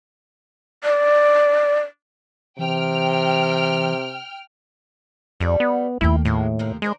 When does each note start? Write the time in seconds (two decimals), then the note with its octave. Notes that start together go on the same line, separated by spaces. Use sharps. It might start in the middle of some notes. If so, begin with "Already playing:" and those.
0.84 D5
2.59 C3 E3 G5 F6
5.40 F2 G3 A3 D5
5.60 B3
6.01 D#2 A3 A#3 E4 G5
6.25 A2 F#3 G#3 A#3
6.59 C3 F3 A#4
6.82 G#3 D4 A#4 C5